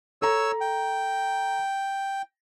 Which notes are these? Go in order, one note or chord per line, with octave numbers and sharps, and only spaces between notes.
A4 C#5 A#5 E6
G5